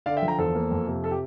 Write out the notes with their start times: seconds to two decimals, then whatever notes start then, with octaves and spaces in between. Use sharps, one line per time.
0.06 D3 D5 F5
0.17 E5 G5
0.22 F3
0.28 G5 A#5
0.38 E2 A4 C5
0.55 A#3
0.71 F2
0.87 C3
1.04 A4
1.11 G4